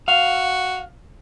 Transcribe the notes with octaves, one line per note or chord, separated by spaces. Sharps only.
F#4 F5